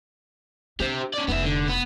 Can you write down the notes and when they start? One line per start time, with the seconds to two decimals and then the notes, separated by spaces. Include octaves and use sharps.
0.80 D4 G4 C5
1.14 C#4 D5
1.28 F1 B3 D#4 E5
1.43 D3
1.68 B3